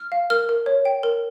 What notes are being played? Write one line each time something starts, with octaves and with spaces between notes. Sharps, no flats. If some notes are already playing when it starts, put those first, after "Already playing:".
Already playing: F6
F5
A#4 F6
A#4
C#5
G5
A#4